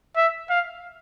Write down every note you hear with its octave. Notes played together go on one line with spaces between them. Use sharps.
E5
F5